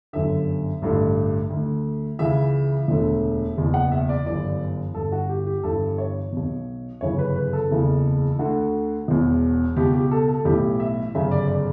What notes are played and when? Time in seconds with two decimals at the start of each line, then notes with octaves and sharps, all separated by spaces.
0.13 G1 F#2 D3 E5
0.82 A1 G2 D3
1.50 D2 D3
2.19 C#2 C#3 E3 E5
2.88 E1 D2 D3
3.57 F#1 E2 B2
3.74 F#5
3.92 E5
4.09 D5
4.26 G1 F#2 E3 D5
4.94 G1 G2 D3 A4
5.12 F#4
5.29 G4
5.47 G4
5.63 G1 G2 E3 A4
5.98 C#5
6.32 B1 B2
7.01 G1 F#2 C#3 E3 C#5
7.19 B4
7.36 B4
7.53 A4
7.71 F#1 E2 C#3 E3
8.39 D2 D3 F#4
9.08 E1 E2 B2
9.76 C#2 B2 G4
9.94 G4
10.11 A4
10.28 A4
10.45 B1 A2 E3 G4
10.80 E5
11.15 G1 F#2 C#3 E5
11.31 D5
11.49 D5